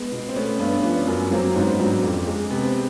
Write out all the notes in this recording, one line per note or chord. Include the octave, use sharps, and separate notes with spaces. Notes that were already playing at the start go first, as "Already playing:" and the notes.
Already playing: G#3 B3
B2
C4
A3 B3 C#4
G2 B3 C#4
D4
F3 B3 C#4
F#2
F#3 A#3 C4
G#2 B3 C#4
F#3 C4 D4
F2
G#3
C3 B3
C4